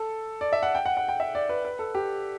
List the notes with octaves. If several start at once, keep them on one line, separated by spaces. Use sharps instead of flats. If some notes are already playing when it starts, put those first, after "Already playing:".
Already playing: A4
D5
E5
F#5
G5
F#5
F#5
G5
E5
D5
B4
B4
A4
G4